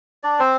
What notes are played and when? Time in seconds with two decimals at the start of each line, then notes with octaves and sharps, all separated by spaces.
0.23 D4 D5
0.40 C4 C5